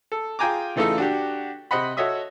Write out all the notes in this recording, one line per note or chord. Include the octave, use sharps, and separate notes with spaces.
A4
F4 G#4 G5 G#5 A#5 D6
C#3 E3 A3 D#4 F4 A4
D4 F#4 G4
C3 C5 D#5 F#5 B5
F#4 A4 C#5 D#5 E5 D#6